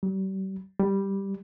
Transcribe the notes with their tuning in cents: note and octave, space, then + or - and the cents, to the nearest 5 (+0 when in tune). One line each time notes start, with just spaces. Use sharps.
G3 -40
G3 +0